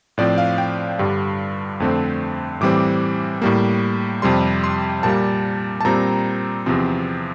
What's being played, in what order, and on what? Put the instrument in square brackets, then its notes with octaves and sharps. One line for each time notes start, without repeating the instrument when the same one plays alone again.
[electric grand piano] A2 F3 C4 D5
F5
G5
G2 D3 G3
F2 D3 A3 C4
A2 E3 G3 C4 D6
A2 G3 A#3
F2 C3 G3 C6
C6
A#2 G3 A#3 A5
A5
A#2 G3 C4 A#5
E2 C3 F3 C4